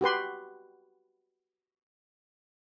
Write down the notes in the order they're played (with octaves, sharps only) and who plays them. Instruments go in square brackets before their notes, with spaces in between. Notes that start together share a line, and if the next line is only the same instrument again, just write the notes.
[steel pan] F#4 G4 B4 C6